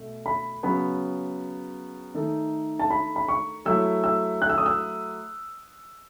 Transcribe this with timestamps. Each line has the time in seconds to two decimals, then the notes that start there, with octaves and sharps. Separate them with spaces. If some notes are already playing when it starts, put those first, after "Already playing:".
Already playing: B2 A3
0.26 B5
0.63 C#3 F#3 B3 B5
2.14 D#3 A3 D#4 A4
2.79 A5
2.90 B5
3.16 B5
3.28 C#6
3.65 F#3 A3 E4 E6
4.04 E6
4.42 F#6
4.50 E6
4.58 D#6
4.66 E6